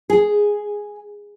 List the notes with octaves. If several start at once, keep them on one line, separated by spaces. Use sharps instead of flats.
G#4